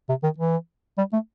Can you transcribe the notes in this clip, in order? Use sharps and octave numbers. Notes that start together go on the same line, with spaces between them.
C3
D#3
E3
G3
A3